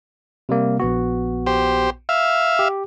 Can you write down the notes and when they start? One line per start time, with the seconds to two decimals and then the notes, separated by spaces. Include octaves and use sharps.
0.49 C3 G3 A#3
0.80 A#1 B3 F#4
1.47 G4 C5
2.09 E5 F5
2.59 G4